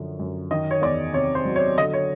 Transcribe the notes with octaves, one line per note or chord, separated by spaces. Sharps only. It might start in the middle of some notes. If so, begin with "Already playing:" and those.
Already playing: F#2 D3 F3
F#2
D#3 D#5
C#5
E2 D5
C3 C#5
C5
F#3
C#5
D3 D#5
C#5